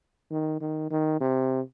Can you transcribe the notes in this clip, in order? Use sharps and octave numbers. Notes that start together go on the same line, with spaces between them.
D#3
D#3
D#3
C3